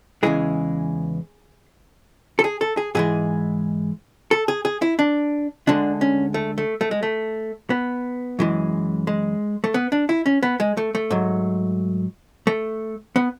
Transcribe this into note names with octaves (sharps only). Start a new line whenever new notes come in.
E2 C#3 E3 G#3 G#4
A4
G#4
A4
G#4
G#2 E3 G#3 G#4
A4
G#4
G#4
E4
D4
D2 D3 G#3 D4
C#4
A3
A3
A3
G#3
A3
B3
F#2 E3 G#3
G#3
A3
B3
D4
E4
C#4
B3
G#3
A3
A3
G#2 F#3
A3
B3